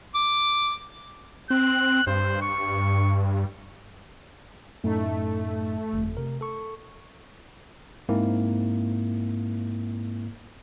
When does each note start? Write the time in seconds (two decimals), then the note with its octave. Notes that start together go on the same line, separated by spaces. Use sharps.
0.15 D6
1.50 C4 F#6
2.07 G2 C5
2.42 C#6
4.84 F#2 A2 A3 D#4
5.93 G1 F2
6.17 C3 A#4
6.41 A4 C#6
8.09 G#2 A#3 C4 E4